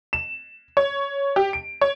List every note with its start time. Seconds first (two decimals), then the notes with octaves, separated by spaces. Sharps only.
0.13 E7
0.77 C#5
1.36 G4
1.53 D7
1.81 C#5